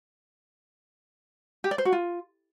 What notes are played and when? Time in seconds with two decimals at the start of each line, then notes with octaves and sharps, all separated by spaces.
1.64 G4
1.71 D5
1.78 C5
1.85 F#4
1.92 F4